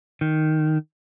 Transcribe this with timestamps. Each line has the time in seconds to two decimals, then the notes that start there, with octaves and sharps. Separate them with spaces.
0.21 D#3